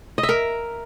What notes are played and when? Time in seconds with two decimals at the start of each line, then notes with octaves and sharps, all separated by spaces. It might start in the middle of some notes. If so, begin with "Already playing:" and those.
0.18 D#5
0.23 E5
0.29 A#4